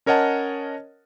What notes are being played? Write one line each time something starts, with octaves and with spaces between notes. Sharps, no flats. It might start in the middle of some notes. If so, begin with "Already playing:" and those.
C#4 A#4 C#5 D#5 F#5 A5